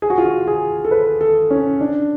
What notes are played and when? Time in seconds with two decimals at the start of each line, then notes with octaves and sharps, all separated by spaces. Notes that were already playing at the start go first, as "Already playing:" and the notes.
0.02 G#4
0.10 F#4
0.18 F4
0.25 F#4
0.47 G#4
0.85 A4
0.91 B4
1.21 A4
1.50 C#4
1.81 D4